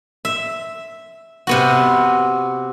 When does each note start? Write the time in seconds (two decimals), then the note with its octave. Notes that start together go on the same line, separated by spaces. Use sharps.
0.25 E5
1.47 C3 B3 F#4